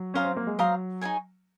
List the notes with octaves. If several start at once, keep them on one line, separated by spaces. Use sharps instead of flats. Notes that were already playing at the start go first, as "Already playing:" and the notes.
Already playing: F#3
C#4 C5 F5 A#5 D#6
C4
A#3
G#3
F#3 C5 F5 A#5 D#6
D#4 G#4 C#5 G#5